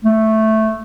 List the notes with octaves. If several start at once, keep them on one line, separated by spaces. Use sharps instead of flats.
A3